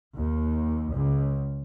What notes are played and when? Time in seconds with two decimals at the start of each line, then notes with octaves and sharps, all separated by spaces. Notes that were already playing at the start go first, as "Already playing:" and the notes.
0.16 D#2
0.95 C#2